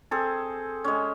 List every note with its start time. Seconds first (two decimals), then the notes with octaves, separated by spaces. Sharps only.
0.11 C4 G#4 A4
0.84 G#3 C#4